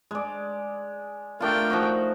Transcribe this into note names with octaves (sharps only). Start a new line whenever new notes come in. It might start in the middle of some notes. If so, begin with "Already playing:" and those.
G#3 D5
A3 D4 F4 A#4 G5
F3 D#4 F#4